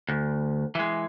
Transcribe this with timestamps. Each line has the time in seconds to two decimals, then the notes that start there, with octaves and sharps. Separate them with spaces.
0.09 D2
0.75 E3 G#3